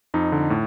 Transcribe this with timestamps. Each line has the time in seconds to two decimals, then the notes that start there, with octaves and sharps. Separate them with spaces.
0.14 F2 D#4
0.32 D3
0.50 A2